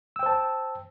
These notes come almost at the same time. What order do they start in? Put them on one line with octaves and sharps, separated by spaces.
E6 G5 C5 A5